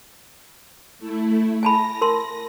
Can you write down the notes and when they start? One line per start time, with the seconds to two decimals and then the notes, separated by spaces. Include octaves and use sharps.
0.99 A3 E4
1.63 G#5 A5 B5 A#6
2.01 A#4 A5 C6